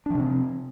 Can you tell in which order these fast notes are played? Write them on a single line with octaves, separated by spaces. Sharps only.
D4 F3 C3 C4